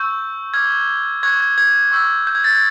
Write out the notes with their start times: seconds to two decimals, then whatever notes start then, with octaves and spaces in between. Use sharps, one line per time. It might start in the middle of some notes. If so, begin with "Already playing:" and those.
Already playing: C#6 E6 G6
0.54 D6 F6 G#6
1.23 C#6 F#6 G#6
1.41 G#6
1.58 G#6
1.92 C#6 E6 G6
2.27 G6
2.35 G#6
2.44 A6
2.53 G#6